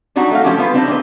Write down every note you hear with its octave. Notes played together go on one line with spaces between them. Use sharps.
F#3 G3 D4 D#4 F#4
A3 D#4 F5
F3 A3 C#4 F#4 G4
G3 B3 F4 B4
C4 D4 D#4
A#2 D#5